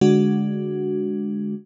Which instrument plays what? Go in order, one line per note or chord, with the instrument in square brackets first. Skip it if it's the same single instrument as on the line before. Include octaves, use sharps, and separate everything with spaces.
[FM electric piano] D3 G#3 D4 F#4